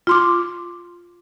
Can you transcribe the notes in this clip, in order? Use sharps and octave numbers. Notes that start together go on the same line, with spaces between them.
F4 C6 D6